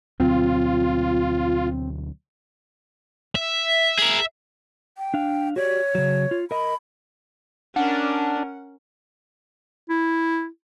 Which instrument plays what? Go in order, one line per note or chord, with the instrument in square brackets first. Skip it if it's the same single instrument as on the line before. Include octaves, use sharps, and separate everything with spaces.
[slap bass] D2 B2 F#3 [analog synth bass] C4 [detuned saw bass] F4
[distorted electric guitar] E5
[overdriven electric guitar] G#4 A#4
[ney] G5
[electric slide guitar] D4 F5
[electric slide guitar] F#4 G4 D5 [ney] C#5
[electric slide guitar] C#3 F#3
F4
[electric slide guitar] A#4 D#5 [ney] B5
[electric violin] C#4 A#4 [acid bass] D4 [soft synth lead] F#5
[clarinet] E4